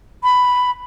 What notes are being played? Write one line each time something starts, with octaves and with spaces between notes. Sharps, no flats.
B5